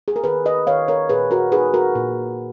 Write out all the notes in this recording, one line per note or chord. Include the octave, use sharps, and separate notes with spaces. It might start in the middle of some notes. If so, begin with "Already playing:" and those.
G#4
A#4
D#3 G#4 B4
B4 D#5
D#3 C#5 F5
A#4 C#5
A#2 G#4 B4
F#4 A#4
D#4 G#4 B4
F#4 A#4
A#2